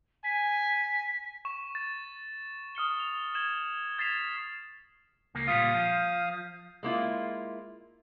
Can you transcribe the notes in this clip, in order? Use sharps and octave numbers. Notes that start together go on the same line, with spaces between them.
G#5 B6
C#6 E7
A6
D#6 F6 C#7 G7
F7
G#6 E7 F#7
G#6 A6 B6 C7 E7 F7
C#2 A#3
A#2 G3 F4 F5 D#6
F3
G#3 A#3 E4 F4